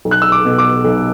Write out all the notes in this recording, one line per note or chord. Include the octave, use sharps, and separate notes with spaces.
B1
F#6
E6
D6
B2
D6
B1